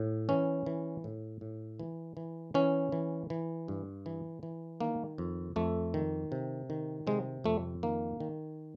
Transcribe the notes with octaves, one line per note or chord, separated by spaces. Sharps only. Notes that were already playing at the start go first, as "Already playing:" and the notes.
Already playing: A2
E3 C#4
E3
A2
A2
E3
E3
E3 C#4
E3
E3
G2
E3
E3
D#3 A#3
F2
F2 A3
D#3
C3
D#3
C3 G#3
F2 A3
D#3 A#3
D#3